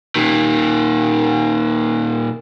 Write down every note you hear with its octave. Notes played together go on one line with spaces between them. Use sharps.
A#2 D#3